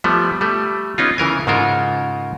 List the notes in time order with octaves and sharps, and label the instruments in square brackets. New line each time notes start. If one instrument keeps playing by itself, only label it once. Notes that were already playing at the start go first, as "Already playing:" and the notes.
[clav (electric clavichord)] F3 G3 A3 B3
G3 A3
B3 C#4 D#4 F4
C#3 E3 A#4 G#5
G#2 C#3 G#3 F4 A4 A#4